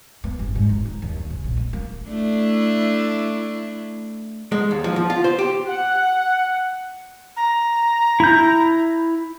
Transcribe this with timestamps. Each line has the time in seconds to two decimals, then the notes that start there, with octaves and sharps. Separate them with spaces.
0.24 B3
0.39 G1
0.55 G#2
0.69 D#4
0.85 D#4
1.02 D#2
1.16 D3
1.30 C#3
1.44 A#1
1.57 B3
1.73 A#3
2.08 A3 D4 E4
4.52 G#3
4.71 D#2
4.84 F3
4.96 F3
5.10 F4
5.24 C5
5.39 G4
5.68 F#5
7.37 A#5
8.20 E4 G6